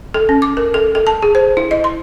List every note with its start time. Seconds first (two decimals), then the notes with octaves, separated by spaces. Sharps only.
0.14 A4
0.29 C#4
0.42 D6
0.57 A#4
0.74 A4
0.95 A4
1.07 A5
1.23 G#4
1.35 C5
1.57 E4
1.71 D#5
1.84 C6